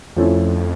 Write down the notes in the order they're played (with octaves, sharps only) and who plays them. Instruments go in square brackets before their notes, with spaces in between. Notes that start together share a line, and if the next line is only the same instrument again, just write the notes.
[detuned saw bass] F2 [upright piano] F3 A3 C#4 E4